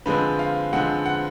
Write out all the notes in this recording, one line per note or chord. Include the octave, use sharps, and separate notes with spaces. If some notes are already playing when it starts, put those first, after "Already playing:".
D3 F3 G#3 C4 B4
F5
D3 F3 G#3 C4 F#5
F#5